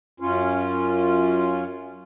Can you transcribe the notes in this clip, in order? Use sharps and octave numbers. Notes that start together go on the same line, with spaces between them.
F#2 C#4 F4